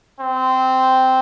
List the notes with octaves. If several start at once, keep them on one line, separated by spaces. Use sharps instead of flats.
C4